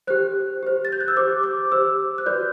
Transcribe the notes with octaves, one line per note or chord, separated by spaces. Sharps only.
G4 C5 F#6
G4 C5
A6
G6
F#6
E6
G4 C5 D6
D6
G4 C5 E6
F#6
F#4 B4 D5 G6